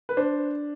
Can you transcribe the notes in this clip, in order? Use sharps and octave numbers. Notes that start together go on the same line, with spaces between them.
B4
D4 C5